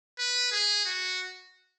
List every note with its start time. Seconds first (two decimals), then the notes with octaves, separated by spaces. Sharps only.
0.19 B4
0.52 G#4
0.85 F#4